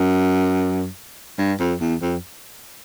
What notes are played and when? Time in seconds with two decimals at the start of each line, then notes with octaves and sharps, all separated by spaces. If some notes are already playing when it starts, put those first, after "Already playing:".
Already playing: F#2
1.39 G2
1.60 F2
1.80 E2
2.02 F2